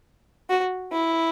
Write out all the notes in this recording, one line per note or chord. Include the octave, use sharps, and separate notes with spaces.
F#4
E4